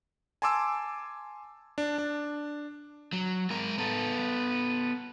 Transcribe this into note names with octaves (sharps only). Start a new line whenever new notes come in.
G#5 A5 C6 D6 E6
D4
D4
F#3
G#3 A#4
B3 A4